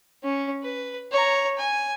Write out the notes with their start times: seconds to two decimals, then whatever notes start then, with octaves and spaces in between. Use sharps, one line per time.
0.24 C#4
0.64 B4
1.12 C#5 A#5
1.57 G#5